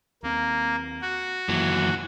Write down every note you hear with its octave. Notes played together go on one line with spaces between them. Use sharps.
D#2 A#3 C4
F#4
F#2 D#3 E3 F#3 A#3